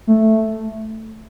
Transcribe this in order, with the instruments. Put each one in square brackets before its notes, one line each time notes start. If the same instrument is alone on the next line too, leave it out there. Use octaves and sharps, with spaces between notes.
[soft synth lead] A3